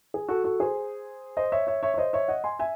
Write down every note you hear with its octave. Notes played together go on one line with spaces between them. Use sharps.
G#4
F#4 A4
F#4 A4
G#4 C5
C5 D#5
C#5 E5
C#5 E5
C#5 E5
C#5
C5 D#5
C#5 E5
D#5 F#5
G#5 C6
E5 G#5